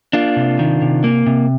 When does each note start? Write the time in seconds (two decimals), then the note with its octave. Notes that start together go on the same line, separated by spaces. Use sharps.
0.13 A#3 D4 F4
0.36 C3
0.59 D#3
0.82 C3
1.04 A#3
1.26 C3